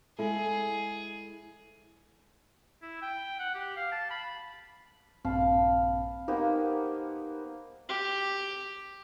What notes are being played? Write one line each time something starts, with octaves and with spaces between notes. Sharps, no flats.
G#3 E4 G#4 A4
E4
G5
F#5
G4
F5
A5
B5
A#1 G2 C4 F5 A5 B5
A#3 B3 D#4 G4 C5
G4